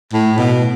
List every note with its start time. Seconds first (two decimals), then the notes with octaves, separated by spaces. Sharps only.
0.13 A2
0.38 B2